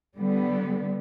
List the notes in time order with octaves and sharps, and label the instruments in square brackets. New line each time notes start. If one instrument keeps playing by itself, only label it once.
[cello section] D3 G3 B3